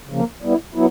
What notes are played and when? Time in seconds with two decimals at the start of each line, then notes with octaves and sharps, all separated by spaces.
0.09 C#3 F3 A#3
0.42 G3 B3 E4
0.75 F#3 B3 E4